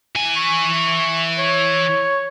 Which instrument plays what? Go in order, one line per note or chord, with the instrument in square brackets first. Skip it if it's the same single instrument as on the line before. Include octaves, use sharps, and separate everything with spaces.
[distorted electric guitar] E3 G#5
[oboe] C#6
C#5